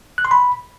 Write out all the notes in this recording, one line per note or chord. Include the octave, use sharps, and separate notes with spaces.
F#6
C6
B5